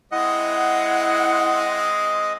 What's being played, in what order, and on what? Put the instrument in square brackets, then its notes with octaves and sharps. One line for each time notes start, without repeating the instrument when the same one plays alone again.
[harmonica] G#3 C4 [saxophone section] E4 F#5 [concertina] D#5